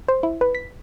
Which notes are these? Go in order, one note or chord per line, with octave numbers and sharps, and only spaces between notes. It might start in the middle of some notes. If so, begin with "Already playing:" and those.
C5
E4
B4
B6